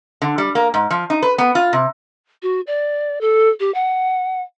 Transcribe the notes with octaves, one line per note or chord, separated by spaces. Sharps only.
D3
G3
A#3
G#2
F3
D#4
B4
B3
F4
C3
F#4
D5
A4
G4
F#5